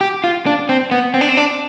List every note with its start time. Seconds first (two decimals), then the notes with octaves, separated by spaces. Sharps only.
0.01 G4
0.24 F4
0.46 D4
0.69 C4
0.91 B3
1.14 C4
1.21 D4
1.29 C4
1.37 D4